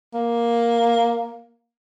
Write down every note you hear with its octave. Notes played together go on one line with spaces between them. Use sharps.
A#3